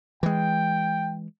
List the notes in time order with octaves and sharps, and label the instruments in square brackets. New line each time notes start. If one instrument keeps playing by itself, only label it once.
[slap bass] E3 G#3 [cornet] G5